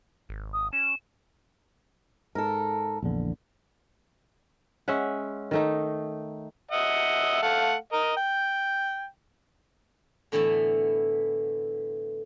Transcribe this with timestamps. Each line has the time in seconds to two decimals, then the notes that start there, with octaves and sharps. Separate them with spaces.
0.29 G#1
0.53 D#6
0.73 C#4 E7
2.35 G#2 A4 A#4
3.02 A#1 E2 D3
4.88 G#3 C#4 E5 F#5
5.51 D#3 A3 D#4
6.71 D#5 E5 F#5
7.43 A3 F5 F#5
7.93 A#4 D#5
8.17 G5
10.32 A2 D3 E3 B3 E5 A5